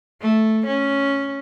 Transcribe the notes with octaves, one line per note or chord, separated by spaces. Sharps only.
A3
C#4